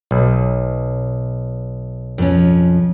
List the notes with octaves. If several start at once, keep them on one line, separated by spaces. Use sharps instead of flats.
B1
F2 F3 C#4